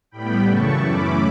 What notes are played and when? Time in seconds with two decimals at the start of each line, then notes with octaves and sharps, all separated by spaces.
0.11 A2 G3 B3 G5 B5
0.47 F#2 C#3 E3 A3 A5 C#6
0.84 F#2 E3 A3 C#4 E4 B5 D6